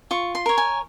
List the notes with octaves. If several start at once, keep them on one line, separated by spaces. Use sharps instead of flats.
F4 C#6
C6
A#4 C#5
G#5